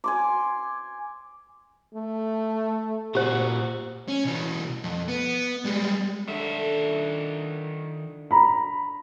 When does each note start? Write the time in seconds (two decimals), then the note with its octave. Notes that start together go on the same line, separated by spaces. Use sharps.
0.04 G#5 C6 D6
1.95 A3
3.15 A#2 F#4 G4 C5
4.09 C#4
4.25 B1 E3
4.84 F2
5.09 B3
5.66 G3 G#3
6.28 D3 D#3 E5
8.31 A#5 B5